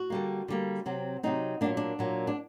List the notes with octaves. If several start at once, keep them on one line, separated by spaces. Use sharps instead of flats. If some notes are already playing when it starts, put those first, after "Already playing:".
Already playing: F#4
D3 G3 A#3
D3 G3 A#3
C3 F#3 C4
C3 F#3 C4 D#4
A#2 F#3 A#3 D4
D4
A#2 F#3 A#3
D4